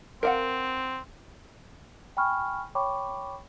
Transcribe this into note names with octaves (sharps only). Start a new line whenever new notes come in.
C4 A#4 F5 F#5
G5 G#5 B5 C#6 F6
C#5 G5 B5 C#6 D6